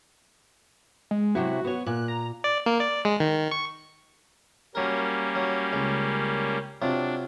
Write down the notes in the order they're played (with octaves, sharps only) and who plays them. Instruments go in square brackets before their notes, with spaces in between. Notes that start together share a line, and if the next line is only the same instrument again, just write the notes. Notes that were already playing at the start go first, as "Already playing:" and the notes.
[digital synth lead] G#3
[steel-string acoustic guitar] C3 F#3 E4 [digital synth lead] F#4
[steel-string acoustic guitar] B3 C#5
[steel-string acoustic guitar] A#2 [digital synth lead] F#6
[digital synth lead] A#5
[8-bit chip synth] D5
A#3
D5
G#3
D#3
C#6
[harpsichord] F#3 A#4 [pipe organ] G3 A#3 C#4
[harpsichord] F#3
C#2
[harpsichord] C3 F#3 F4 [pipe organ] D4